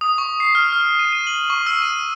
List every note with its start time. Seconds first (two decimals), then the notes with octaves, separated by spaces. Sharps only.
0.01 D#6
0.18 C#6
0.40 C7
0.55 F6
0.72 F6
0.99 D#7
1.12 D#7
1.27 F#7
1.50 C#6
1.66 E6
1.82 D#7